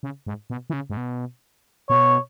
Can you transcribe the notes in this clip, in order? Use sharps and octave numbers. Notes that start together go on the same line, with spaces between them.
C#3
G#2
B2
E3
C#3
G#2
B2
B2 C#5